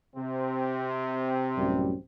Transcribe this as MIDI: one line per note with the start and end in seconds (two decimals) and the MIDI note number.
0.16 2.02 48
0.16 2.02 60
1.56 1.93 33
1.56 1.93 42
1.56 1.93 55